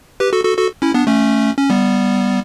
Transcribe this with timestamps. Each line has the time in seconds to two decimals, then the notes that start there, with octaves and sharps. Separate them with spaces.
0.20 G4 B4
0.33 F#4 A4
0.44 F#4 A4
0.58 F#4 A4
0.82 C#4 E4
0.94 B3 D4
1.07 A3 C#4
1.58 C#4
1.70 G3 B3